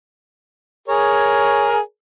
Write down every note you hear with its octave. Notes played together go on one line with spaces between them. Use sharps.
G#4 A#4 C#5